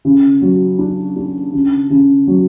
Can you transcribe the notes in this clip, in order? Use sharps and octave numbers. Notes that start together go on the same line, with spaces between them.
C#3
F#3
D4
D4
C#3
C#3
F#3